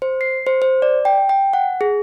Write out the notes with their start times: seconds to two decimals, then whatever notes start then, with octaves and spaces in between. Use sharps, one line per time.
0.02 C5
0.21 C7
0.47 C5
0.62 C5
0.82 D5
1.05 G5
1.29 G5
1.53 F#5
1.81 G#4